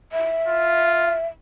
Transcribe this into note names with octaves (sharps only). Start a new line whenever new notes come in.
E5
F4